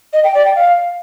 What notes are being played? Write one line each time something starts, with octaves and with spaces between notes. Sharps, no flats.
D#5
G5
D5
G5
F5